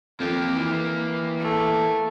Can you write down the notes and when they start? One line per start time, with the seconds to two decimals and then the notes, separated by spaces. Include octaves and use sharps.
0.20 F2 A#3 G4
0.55 E3
1.40 A3